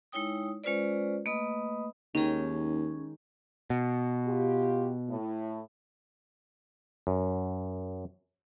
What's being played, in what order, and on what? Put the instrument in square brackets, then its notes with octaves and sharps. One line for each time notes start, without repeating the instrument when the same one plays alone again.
[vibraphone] G#3 D#4 E4 C#5 G5 D#6
G#3 C#4 F4 B4 C5 D5
A3 A#3 B4 D#5 B5 D#6
[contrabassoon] D#2 [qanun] D#3 G#3 C#5 [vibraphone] C#4 G#4
[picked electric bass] B2
[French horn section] F4 G4
A2
[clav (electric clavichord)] F#2